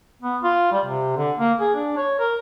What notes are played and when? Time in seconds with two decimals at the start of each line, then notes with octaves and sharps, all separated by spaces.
0.22 B3
0.43 F4
0.72 G3
0.85 C3
1.17 D3
1.39 A#3
1.60 G#4
1.75 D4
1.97 C#5
2.20 A#4